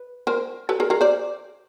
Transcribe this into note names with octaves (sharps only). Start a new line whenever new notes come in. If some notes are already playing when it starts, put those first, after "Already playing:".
Already playing: B4
A#4 C5
A4 B4
G#4 A#4
G#4 A#4
C5 D5